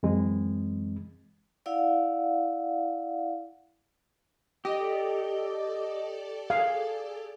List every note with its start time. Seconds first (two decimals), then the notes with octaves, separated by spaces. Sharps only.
0.03 F#2 E3 G#3 C4
1.66 E4 D5 F5 F#5
4.65 G4 A4 D5 D#5
6.50 G#4 F5